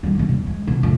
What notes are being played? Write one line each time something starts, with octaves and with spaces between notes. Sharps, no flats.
G#1 G3
G#2 B2
E2
G#3
B2
F1 A#1